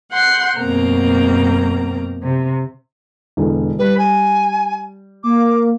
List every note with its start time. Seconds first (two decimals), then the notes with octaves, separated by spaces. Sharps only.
0.11 F#5 C6 G6
0.57 F#2 B2 A#3 C4 A#5
2.22 C3
3.37 E1 B2 D3
3.79 G3 B4
3.98 G#5
5.24 A#3 D6